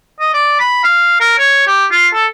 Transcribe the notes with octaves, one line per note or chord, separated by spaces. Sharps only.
D#5
D5
B5
F5
A#4
C#5
G4
F4
A4